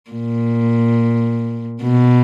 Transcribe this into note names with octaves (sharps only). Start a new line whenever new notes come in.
A#2
B2